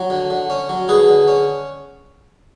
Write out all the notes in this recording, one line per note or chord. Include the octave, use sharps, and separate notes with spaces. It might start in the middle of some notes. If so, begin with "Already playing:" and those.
Already playing: F#3 C#5
D3
D3
C#4
F#3
D3 G#4 B4
D3
C#4